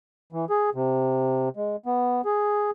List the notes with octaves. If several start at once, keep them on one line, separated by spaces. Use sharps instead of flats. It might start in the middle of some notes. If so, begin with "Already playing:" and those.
E3
G#4
C3
G#3
B3
G#4